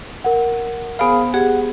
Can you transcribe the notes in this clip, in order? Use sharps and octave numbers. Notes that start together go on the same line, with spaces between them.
A#4 F#5
B3 G#4 C5 F5 B5
G4 G#4 F#5